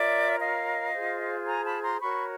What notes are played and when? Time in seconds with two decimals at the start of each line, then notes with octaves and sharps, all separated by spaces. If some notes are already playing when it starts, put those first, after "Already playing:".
Already playing: F4 A#4 C#5 D5 E5
0.39 D#5 F5
0.93 F4 G#4 C5
1.47 G#5 A#5
1.65 A5 B5
1.83 A#5 C6
2.00 F#4 A#4 C#5 B5 C#6